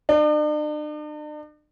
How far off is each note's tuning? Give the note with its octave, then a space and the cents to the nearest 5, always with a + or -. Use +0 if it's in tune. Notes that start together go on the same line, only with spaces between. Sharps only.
D4 +45